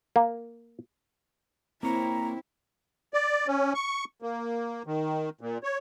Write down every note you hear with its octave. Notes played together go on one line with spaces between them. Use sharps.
A#3
A#3 C4 E4 C#5 A#5
D5
C#4
C#6
A#3
D#3
A#2
C#5